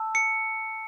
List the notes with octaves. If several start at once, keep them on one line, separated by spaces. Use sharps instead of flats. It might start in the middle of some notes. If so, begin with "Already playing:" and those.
Already playing: A5 E6
C#7